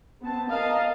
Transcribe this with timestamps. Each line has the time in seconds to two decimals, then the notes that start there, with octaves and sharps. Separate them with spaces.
0.22 B3 C4 A5
0.50 A#4 D#5 F5 A5